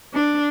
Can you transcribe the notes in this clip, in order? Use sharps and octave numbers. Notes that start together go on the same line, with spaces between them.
D4